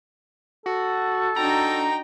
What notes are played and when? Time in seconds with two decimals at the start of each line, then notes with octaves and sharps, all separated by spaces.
0.66 F#4 A4
1.36 D4 D#4 F#4 G5 A#5